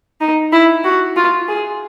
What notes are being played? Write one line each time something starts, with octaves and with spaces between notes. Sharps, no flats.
D#4
E4
F#4
F4
G#4